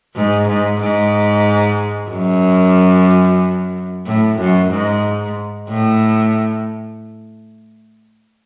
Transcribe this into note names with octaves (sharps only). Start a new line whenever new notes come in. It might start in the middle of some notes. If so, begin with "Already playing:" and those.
G#2
G#2
G#2
F#2
A2
F#2
G#2
A2